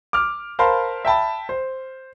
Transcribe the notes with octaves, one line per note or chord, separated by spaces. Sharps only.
D6 F6
A#4 C5 F5 A5 B5 C6
E5 G5 A5 B5
C5